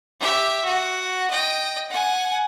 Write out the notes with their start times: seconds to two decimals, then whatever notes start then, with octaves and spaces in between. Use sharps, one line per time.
0.20 G4 E5
0.65 F#4
1.31 D#5 G5
1.89 F#5 G#5